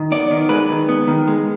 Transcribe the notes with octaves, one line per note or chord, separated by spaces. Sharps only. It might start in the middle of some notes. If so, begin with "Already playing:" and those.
Already playing: D#3
B3 D5
D#3
G#3 B4
D#3
B3
D#3
G#3